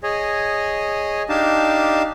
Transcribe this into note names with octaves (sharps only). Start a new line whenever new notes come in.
G#4 C#5 D#5
D4 D#4 G4 F5 A5